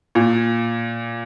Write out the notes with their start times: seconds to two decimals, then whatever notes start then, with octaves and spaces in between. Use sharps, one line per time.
0.15 A#2